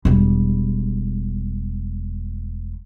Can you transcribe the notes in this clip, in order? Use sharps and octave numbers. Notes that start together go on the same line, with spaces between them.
E1 G3